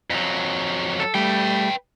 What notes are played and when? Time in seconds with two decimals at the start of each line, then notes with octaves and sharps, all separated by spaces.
0.10 F2 F#3
1.00 A4
1.15 G3 A3 B4 G5